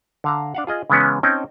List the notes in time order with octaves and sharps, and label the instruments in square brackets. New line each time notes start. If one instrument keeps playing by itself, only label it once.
[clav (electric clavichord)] D3 F5 A#5
D4 F5 F#5
F4 G#4 D#5
C#3 E3 G#3 B3 C#4
C4 C#4 D#4 G5 A5